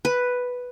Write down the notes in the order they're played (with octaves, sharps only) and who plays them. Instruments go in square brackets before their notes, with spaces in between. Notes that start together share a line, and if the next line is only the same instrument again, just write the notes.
[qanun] B4